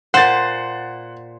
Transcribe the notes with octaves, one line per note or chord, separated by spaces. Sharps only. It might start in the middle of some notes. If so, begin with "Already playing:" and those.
A#2 C5 F#5 A6